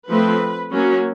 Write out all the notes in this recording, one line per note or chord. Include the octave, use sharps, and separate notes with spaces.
F3 A3 C4 B4
F#3 A#3 C#4 F#4